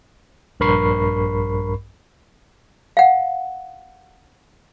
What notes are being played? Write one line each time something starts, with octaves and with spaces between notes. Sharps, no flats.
A#1 G2 A#4 B5 C#6 C7
F5 F#5